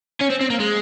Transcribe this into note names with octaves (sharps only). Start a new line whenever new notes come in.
C#4
C4
C4
A#3
G#3